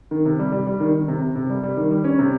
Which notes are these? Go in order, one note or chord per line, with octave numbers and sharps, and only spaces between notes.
D#3
C3
G3
G3
G3
D#3
D#3
C3
C3
C3
G3
G3
D#3
G3
C#4
C3